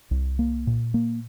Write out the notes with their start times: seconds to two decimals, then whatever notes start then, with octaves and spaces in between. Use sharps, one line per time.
0.11 C2
0.39 A#3
0.67 A#2
0.94 A#3